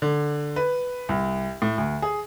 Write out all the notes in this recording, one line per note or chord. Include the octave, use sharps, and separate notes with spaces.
D3
B4
C2
A2
D2
G#4